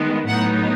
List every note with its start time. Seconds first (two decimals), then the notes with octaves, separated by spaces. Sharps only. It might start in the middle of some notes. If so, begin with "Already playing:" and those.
Already playing: D#3 G#3 B3
0.27 A2 F#3 B3 D#4 F#5